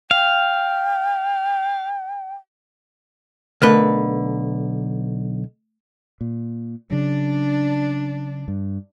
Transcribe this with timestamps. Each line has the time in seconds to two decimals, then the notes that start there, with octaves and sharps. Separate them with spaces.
0.11 F5 G5
3.62 B1 D3 A3 A#4 B4
6.21 A#2
6.90 C#3 F#3 D4
8.48 G2